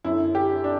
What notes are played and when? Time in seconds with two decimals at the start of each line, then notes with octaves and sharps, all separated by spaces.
0.04 F#2 D3 E4
0.35 G4
0.64 D4